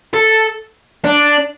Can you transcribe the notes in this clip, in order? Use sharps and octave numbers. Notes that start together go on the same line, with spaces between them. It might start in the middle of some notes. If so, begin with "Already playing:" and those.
A4
D4